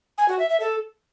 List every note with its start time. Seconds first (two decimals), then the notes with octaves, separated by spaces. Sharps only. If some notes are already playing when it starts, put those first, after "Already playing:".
0.18 G#5
0.28 F#4
0.39 E5
0.49 E5
0.60 A4